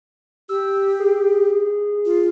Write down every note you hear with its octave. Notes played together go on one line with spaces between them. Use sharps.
G4 E6
G#4
F4